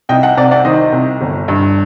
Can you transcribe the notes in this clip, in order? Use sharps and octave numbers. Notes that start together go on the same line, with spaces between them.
C2 D#5 G5
F#5 A5
C3 D5 F#5
D5 F#5
D#3 C5 D#5
C2
G1
G2